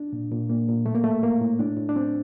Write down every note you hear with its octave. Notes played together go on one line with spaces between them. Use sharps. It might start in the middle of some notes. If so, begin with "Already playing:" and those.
Already playing: D4
A#2
A#2
A#2 A#3
A#2
A2 A3
A#3
A2 A3
A2 A#3
A2
A2 D4
A2
D4
A2 C4